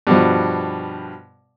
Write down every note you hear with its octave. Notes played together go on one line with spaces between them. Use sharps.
G2 B2 F3